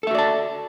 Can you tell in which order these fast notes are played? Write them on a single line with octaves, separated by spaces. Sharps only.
A4 E5 F#4 D5 A5